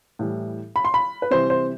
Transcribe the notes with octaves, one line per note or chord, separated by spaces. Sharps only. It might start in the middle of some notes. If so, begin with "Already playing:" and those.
A2 E3 G3
B5
C6
B5
B4
C3 E3 G3 C5
C5